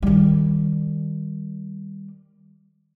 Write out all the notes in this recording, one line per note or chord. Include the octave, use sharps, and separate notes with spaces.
D#3 G3